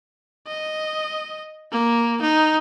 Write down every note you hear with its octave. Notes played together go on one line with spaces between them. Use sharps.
D#5
A#3
D#4